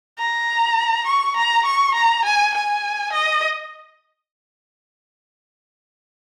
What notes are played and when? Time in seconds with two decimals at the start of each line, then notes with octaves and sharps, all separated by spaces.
0.18 A#5
1.06 C#6
1.37 A#5
1.65 C#6
1.95 A#5
2.25 G#5
2.54 G#5
3.13 D#5